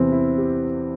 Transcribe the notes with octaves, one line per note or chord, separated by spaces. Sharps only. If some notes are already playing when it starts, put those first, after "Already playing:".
Already playing: E2 C3 E3 C4
E4
G4